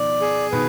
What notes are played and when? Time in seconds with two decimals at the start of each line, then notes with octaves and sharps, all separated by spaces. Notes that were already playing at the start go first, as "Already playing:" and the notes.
Already playing: B2 D#3 F3 D5
0.21 G#4
0.52 B2 D#3 B4